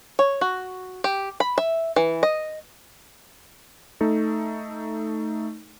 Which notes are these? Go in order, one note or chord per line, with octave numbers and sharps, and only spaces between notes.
C#5
F#4
G4
B5
E5
E3
D#5
A3 D#4 A4